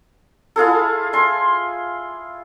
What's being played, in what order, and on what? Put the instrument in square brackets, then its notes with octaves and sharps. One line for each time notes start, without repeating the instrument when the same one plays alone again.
[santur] E4 F4 G#4 A4
G#5 C6